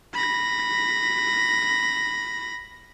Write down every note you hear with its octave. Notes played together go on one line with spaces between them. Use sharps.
B5 A#6